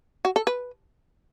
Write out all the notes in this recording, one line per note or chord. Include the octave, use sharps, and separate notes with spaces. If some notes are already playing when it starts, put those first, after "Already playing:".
F#4
A4
B4